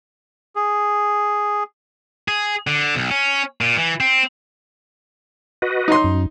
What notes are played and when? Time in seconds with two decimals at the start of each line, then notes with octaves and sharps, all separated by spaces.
0.56 G#4
2.28 G#4
2.67 D3
2.96 B1
3.11 C#4
3.61 A#2
3.77 E3
4.00 C4
5.62 F#4 B4 D#5
5.88 D#4 C6
6.04 F#2